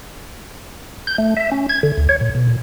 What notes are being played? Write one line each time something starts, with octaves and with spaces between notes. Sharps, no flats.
G6
A3
E5
C#4
G#6
D3
D2
C#5
A#2
B2
A#2